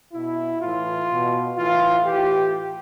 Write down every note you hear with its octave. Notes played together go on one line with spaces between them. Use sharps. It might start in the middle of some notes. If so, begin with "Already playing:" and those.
B2 E4
A2 E3 F4
B2
A2 E3 F4
A2 E3 G4